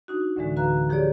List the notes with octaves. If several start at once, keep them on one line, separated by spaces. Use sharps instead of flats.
D4 D#4 F#4
D2 A2 D3 E3 G#3
D3 F#4 B4 F5 A#5 F#6
F3 G4 G#4 C#5 D5